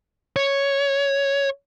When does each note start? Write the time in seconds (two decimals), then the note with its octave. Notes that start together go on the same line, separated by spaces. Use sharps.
0.36 C#5